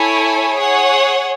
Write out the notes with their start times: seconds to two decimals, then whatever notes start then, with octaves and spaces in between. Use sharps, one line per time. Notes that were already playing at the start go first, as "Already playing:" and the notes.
Already playing: E4 A4 C#5 G#5
0.54 G#4 C#5 F#5